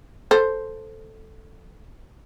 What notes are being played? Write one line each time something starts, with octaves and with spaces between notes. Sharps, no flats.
A4 C5